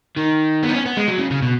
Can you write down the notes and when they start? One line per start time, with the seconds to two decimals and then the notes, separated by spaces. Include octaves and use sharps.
0.17 D#3
0.63 B3
0.68 D#4
0.74 C#4
0.85 B3
0.97 G#3
1.08 F#3
1.19 C#3
1.31 C#3
1.42 B2